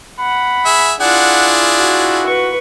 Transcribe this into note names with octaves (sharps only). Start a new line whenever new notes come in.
F#5 B5
G#4 E5
D4 E4 F4 G#4 F#5
F#4
B4 C#6